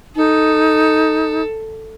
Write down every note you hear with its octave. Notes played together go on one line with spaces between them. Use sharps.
D#4 A4